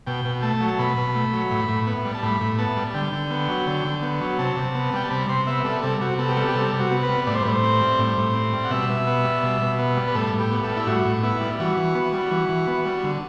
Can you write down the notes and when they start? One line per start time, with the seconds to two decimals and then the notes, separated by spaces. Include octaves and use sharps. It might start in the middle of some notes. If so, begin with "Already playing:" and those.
0.07 B2 G5
0.25 B2
0.42 A3 A5
0.60 F#3
0.68 A5
0.79 B2 B5
0.97 B2
1.15 A3
1.33 F#3
1.51 A2
1.68 A2
1.87 B3
2.05 G3
2.15 A5
2.23 A2 B5
2.41 A2
2.59 B3 A5
2.77 G3
2.94 D3 G5
3.13 D3
3.31 B3
3.49 F#3
3.67 D3
3.85 D3
4.02 B3
4.21 F#3
4.39 C3 A5
4.57 C3
4.75 B3
4.93 G3 G5
5.04 A5
5.10 C3 B5
5.29 C3 C6
5.47 B3 E5
5.65 G3 A4
5.82 C3 A4
6.01 C3 F#4
6.18 B3 A4
6.28 G4
6.37 G3 A4
6.48 G4
6.55 C3 A4
6.73 C3
6.79 F#4
6.91 B3
7.03 B4
7.09 G3
7.27 A2 D5
7.35 C5
7.42 B4
7.45 A2 C5
7.63 C4
7.81 G3
7.99 A2
8.18 A2
8.35 C4
8.53 G3
8.64 F#5
8.71 B2 E5
8.89 B2
9.07 B3
9.25 G3
9.43 B2
9.61 B2
9.79 B3
9.97 G3
10.08 B4
10.15 A2 A4
10.33 A2
10.39 G4
10.51 B3
10.63 A4
10.69 G3
10.77 E4
10.87 A2 F#4
11.05 A2
11.23 B3 E4
11.41 G3
11.60 E3 F#4
11.77 E3
11.95 B3
12.13 G3
12.31 E3
12.49 E3
12.67 B3
12.85 G3
13.03 D3